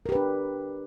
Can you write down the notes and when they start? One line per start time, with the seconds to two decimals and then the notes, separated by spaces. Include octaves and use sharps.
0.06 A#4
0.09 G4
0.12 B4
0.15 D4